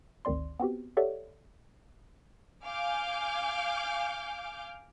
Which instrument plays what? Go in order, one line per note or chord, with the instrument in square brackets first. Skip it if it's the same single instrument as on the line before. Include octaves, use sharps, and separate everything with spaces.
[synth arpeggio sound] G#1 D2 D#3 C4 D5 C6
B3 C4 F#4 G4
G4 A4 C#5 D5 E5 F#5
[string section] F5 G#5 D6 F6 G6